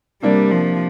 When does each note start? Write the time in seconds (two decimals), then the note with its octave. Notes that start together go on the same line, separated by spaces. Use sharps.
0.23 C3 G3 A#3 D4
0.51 F3